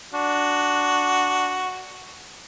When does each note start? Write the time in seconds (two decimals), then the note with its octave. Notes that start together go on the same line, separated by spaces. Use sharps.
0.13 D4 F#4